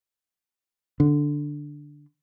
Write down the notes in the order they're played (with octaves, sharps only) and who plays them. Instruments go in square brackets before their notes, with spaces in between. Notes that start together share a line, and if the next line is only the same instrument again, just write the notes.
[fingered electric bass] D3